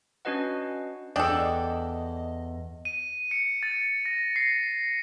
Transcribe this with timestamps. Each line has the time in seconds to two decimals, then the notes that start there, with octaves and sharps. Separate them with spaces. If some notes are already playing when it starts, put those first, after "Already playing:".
0.25 C#4 D4 F#4 B4 D#5 F#5
1.16 E2 D4 A4 D5 D#5 G5
2.85 D#7
3.31 C#7
3.63 A6
4.06 A#6
4.36 C7